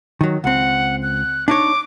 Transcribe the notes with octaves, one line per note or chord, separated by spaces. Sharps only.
D#3 F#3
C#2 C4 F#5
F#6
D4 D#4 C#5 D6